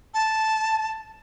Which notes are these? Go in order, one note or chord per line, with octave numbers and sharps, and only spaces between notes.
A5